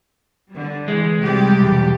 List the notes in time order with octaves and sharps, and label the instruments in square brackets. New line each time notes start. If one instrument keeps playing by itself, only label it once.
[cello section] D3 G3
[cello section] E3 [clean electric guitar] G#3
[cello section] C3 G3 G4
[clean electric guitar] B1 E2